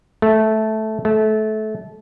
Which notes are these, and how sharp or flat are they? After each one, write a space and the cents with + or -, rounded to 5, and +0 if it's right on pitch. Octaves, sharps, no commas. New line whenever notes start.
A3 -10
A3 -25